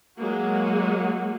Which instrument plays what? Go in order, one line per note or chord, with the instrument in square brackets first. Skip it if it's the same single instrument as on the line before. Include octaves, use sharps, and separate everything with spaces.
[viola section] F#3 G#3 A#3 F#4